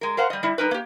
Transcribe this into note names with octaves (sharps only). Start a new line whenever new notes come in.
G#3 A#4
A#4 C5 F5 F#5
G3 D#5
G3 E4
G3 D#4 A#4 B4
A#3 G4